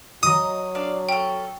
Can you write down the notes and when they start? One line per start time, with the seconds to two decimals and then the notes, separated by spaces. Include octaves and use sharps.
0.23 F#3 D#5 A#5 D#6
0.75 D4 D5 F5
1.09 C#4 A4 G5